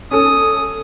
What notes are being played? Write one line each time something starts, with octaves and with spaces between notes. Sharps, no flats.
C#4 A4 D#6